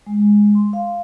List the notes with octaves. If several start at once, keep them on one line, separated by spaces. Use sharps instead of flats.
G#3
C6
F5